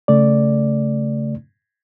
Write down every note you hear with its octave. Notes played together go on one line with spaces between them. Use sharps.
C#3 A3 D5